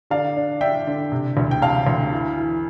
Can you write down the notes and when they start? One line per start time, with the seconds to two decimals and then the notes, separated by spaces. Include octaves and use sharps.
0.10 D3 D5 F5
0.36 D4
0.61 D4 E5 G5
0.87 D3
1.12 C3
1.37 D2
1.51 G5
1.62 C3 F5 A5
1.87 D2
2.12 E3
2.38 E3